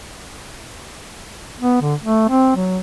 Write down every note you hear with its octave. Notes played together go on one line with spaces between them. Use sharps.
B3
D3
A3
C4
F#3